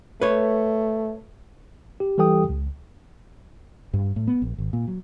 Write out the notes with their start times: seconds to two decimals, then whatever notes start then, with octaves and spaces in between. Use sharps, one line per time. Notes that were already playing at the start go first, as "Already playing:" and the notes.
0.21 A3 B4 C#5
2.00 G4
2.18 E3 G3 G4 A4 G5 D#6
2.49 C#2
3.94 G2
4.16 A2
4.28 B3
4.42 A#1
4.58 G#1
4.73 A#2
4.88 F#3